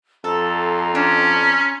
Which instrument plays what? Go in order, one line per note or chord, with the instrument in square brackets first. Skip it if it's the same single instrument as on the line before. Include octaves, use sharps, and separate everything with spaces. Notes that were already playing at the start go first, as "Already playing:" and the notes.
[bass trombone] F2 [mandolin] A4 [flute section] A#5 C6
[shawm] C#4 [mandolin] D4